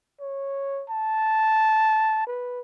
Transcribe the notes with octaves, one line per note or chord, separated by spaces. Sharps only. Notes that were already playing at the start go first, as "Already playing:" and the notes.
C#5
A5
B4